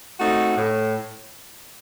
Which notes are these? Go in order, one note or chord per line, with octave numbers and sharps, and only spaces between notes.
A3 C4 D#4 F#4
A2